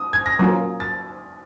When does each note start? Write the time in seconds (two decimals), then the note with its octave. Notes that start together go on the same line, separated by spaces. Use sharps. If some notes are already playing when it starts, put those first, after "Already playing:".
Already playing: D#6
0.13 G#6
0.26 A#6
0.39 F#3 A#3 C#4 F4 A#4
0.80 A6